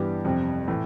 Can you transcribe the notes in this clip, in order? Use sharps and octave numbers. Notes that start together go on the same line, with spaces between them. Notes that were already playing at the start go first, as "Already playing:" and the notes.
Already playing: G2 E3 B3 D4 G4
F2 C3 G3
A2 E3